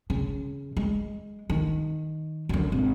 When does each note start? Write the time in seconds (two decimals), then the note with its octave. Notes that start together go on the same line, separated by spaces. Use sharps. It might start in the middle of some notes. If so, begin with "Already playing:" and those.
0.10 C#3
0.77 G#3
1.50 D#3
2.49 F#2 D3
2.72 G#1